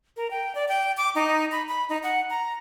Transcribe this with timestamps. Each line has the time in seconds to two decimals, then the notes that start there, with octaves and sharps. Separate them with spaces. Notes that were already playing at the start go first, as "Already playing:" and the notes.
0.17 A#4
0.31 G5
0.55 D5
0.68 G5
0.97 D6
1.15 D#4
1.52 B5
1.68 B5
1.89 D#4
2.03 F#5
2.30 A#5